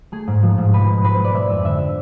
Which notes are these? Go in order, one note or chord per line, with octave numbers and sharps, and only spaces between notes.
A3 G#4
G#2
F3
G#2
B2 B4
B2
G#3 B4
C5
G#3
D5
G#3 E5
F2 E5
D3 E5